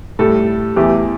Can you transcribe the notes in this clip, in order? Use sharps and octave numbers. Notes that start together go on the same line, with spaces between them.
A2 G3 A4
E2 E3 A3 G4